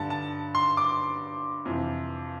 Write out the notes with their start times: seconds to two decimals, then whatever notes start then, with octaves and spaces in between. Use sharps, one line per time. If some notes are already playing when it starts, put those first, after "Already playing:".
Already playing: G2 D3 A5
0.10 A5
0.55 C6
0.77 D6
1.65 F2 C3 E3